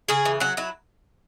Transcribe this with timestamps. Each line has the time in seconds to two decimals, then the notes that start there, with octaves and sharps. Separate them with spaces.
0.08 C#3 G#4
0.25 E3
0.40 F#3 F#4
0.57 F#3 E4